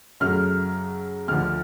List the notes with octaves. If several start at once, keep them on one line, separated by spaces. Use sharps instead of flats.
F#2 C#3 F#3 A3 F6
D2 D3 F3 F6